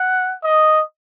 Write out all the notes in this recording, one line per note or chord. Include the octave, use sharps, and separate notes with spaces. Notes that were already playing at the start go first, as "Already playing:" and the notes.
Already playing: F#5
D#5